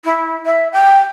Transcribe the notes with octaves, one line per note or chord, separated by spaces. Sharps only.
E4
E5
G5